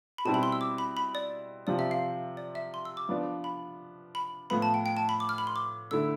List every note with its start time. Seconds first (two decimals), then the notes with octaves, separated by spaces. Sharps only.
0.18 B5
0.25 B2 G3 C4 E4 A5
0.34 B5
0.43 C6
0.52 E6
0.61 D6
0.78 B5
0.97 B5
1.15 D5
1.67 C3 F3 C4 D5
1.79 E5
1.91 F5
2.37 D5
2.55 E5
2.74 C6
2.85 E6
2.97 D6
3.09 F3 B3 D4
3.44 B5
4.15 B5
4.50 A2 F3 B3 B5
4.62 A5
4.74 G5
4.86 G5
4.97 A5
5.09 B5
5.20 D6
5.29 F6
5.38 B5
5.47 C6
5.56 D6
5.91 D3 A3 E4 E6